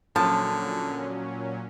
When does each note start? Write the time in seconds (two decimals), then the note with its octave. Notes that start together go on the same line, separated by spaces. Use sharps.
0.16 A#2 D3 F3 F#3 C#4 A5